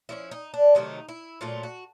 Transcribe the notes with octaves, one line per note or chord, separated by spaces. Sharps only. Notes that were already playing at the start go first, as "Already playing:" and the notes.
F3 A3 C#4 E4
D#4
D4
C3 D#3 F#3 A3 D#4
E4
A#2 F#3 A3 F4
F#4